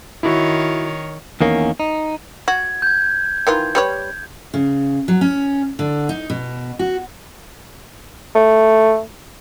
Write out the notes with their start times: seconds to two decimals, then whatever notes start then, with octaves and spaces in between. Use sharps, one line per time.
0.23 D#3 E4 F#4 C#5
1.41 E2 D#3 A#3 C#4
1.80 D#4
2.48 F#4 G#6
2.82 G6 G#6
3.47 D#3 E3 F4
3.75 G3 B4 C#5
4.54 C#3
5.08 F#3
5.21 C#4
5.79 D3
6.09 D#4
6.30 B2
6.79 F#4
8.35 A3